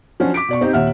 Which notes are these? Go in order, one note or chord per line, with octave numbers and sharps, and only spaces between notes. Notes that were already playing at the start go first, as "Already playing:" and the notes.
F3 F#3 C#4 D4 F4 F#4
D6 B6 D7
B2 D5 C#6
C4 D#4 G4
D#2 A#2 E5 F#5 F6